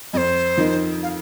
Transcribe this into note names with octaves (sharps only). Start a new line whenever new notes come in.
F2 C5 D#5
F3 D#4 A#4
F5